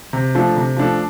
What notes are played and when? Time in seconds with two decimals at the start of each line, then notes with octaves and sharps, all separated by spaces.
0.13 C3
0.35 F3 A3 D4 A4
0.56 C3
0.76 F3 A3 D4 A4